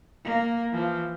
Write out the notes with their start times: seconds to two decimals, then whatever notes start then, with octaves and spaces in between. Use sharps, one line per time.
0.24 A#3
0.71 E3 F3